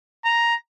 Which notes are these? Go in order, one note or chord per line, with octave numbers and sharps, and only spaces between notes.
A#5